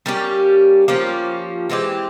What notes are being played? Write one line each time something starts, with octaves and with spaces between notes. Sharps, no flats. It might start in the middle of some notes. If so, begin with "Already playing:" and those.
G3 A#3 C#4 G4
F3 A#3 C#4 G4
E3 G#3 C4 G4